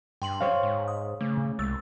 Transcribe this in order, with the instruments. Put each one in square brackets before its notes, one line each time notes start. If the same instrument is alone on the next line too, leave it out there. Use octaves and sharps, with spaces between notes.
[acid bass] G2 [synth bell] G5 C6 F#7
[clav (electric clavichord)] C5 C#5 F5
[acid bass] G#2
[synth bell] D#6
[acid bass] C#3 [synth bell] A3
[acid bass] C2 [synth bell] G#3 E6 A6